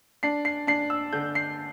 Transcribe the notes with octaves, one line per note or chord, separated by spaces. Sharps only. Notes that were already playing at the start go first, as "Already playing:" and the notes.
D4 C7
C7
D4 C7
E6
D3 G6
C7